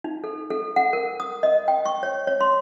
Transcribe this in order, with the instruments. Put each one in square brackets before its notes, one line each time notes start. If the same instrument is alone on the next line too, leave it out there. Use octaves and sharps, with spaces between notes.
[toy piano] D#4
A4
A4
F#5
A#4
D#6
D#5
G5
C#6
C#5
C#5
C6